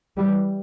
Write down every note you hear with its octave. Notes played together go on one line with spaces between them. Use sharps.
E3 G3